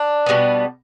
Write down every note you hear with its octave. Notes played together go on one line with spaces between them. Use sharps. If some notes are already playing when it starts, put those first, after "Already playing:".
Already playing: D4
B2 G3 B3